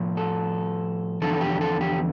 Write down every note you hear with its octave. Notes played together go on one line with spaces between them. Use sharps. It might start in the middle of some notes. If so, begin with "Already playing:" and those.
Already playing: A2 F3
A4
E2 D3 F3 A4
G4
A4
G4